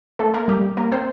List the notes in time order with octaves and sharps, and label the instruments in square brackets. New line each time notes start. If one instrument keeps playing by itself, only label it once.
[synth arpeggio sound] A3 A4
A#3 A#4
G3 G4
A#3 A#4
C4 C5